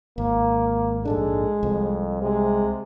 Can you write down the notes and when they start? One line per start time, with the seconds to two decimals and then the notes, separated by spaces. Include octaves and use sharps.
0.18 G#1 A#3
1.05 A#1 G#2 G#3 D4 A4
1.63 C2 F2
2.23 C3 G#3